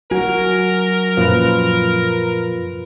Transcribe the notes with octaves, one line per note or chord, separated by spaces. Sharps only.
F#3 F#4 A#4 G#5
F#2 A#2 F3 F4 B4